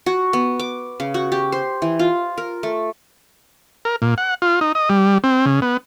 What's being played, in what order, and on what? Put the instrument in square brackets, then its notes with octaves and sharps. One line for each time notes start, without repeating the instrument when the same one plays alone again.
[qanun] F#4
B3
D6
C#3
F#4
G4
C5
E3
F4
A#4
A3
[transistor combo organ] A#4
A#2
F#5
F4
D#4
D#5
G3
C4
C#3
B3